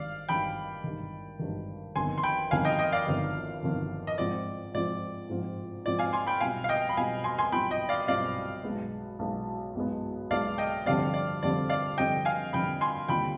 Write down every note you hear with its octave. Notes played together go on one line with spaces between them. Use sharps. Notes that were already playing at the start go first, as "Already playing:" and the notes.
Already playing: G#1 G2 D#3 D5 F5
G#1 G2 D#3 G5 B5
G#1 G2 D#3
G#1 G2 D#3
G1 F2 D#3 B3 G#5 C6
C6
G5 B5
G1 F2 D#3 B3 F5 G#5
D#5 G5
D#5 G5
D5 F5
G1 F2 D#3 B3
G1 F2 D#3 B3
D#5
G#2 F3 C4 F4 D5
G#2 F3 C4 F4 D5
G#2 F3 C4 F4
G#2 F3 C4 F4 D5
F5 G#5
G#5 C6
G5 B5
B1 B2 G3 C4 F4 F5 G#5
F5
D#5 G5
B5
B1 B2 G3 C4 F4 F5 G#5
G#5 C6
G#5 C6
B1 B2 G3 C4 F4 G5 B5
D#5 G5
D5 F5
B1 B2 G3 C4 F4 D5 F5
B1 B2 G#3 B3
B1 B2 G#3 B3
B1 B2 G#3 B3
B1 B2 G#3 B3 D5 F5
D#5 G5
F1 F2 D3 G3 C4 D5 F5
D5
F1 F2 D3 G3 C4 D5
D5 F5
F1 F2 D3 G3 C4 D#5 G5
F5 G#5
F1 F2 D3 G3 C4 G5 B5
G#5 C6
D#2 D3 G3 C4 F4 G5 B5